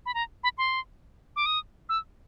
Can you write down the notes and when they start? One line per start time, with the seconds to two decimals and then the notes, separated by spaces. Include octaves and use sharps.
0.06 B5
0.14 A#5
0.44 B5
0.58 C6
1.36 D6
1.46 D#6
1.89 E6